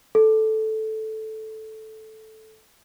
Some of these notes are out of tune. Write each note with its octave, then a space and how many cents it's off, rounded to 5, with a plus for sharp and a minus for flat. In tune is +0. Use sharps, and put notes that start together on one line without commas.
A4 -5